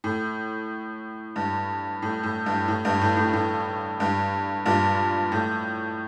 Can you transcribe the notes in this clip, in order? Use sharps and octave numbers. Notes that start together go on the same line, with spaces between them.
A2
G2
A2
A2
G2
A2
G2
A2
A2
A2
G2
G2 A#2
A2